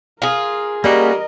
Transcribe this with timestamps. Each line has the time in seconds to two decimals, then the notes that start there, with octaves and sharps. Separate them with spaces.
0.22 F4 G#4 A#4
0.84 G3 A#3 C#4 F#4 A#4 D#5